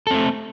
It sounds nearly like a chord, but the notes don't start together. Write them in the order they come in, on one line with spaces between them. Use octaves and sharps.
A4 C4 A3